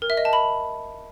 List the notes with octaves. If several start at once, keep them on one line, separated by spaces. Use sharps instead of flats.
A#4
E5
D#5
A5
B5